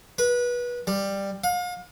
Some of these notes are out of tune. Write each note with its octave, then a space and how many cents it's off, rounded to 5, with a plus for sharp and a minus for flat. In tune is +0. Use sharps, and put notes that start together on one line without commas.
B4 -25
G3 +10
F5 +40